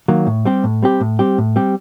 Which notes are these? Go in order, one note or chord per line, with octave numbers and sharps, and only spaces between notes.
D#3 F#3 A#3
A2
G3 C4 G4
A2
G3 C4 G4
A2
G3 C4 G4
A2
G3 C4 G4